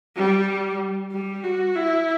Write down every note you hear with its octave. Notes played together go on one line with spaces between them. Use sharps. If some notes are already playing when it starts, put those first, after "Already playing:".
G3
G3
F#4
E4